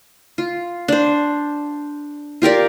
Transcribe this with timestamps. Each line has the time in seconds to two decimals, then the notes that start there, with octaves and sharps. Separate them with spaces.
0.38 F4
0.88 D4 C5
2.42 F4 G4 A#4 D5